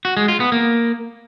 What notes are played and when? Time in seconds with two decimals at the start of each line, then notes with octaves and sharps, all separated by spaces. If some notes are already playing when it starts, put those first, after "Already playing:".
0.05 F#4
0.17 G#3
0.28 F4
0.40 B3
0.52 A#3